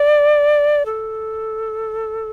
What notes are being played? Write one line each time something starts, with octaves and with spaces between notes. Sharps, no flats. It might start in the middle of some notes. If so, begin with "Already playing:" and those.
Already playing: D5
A4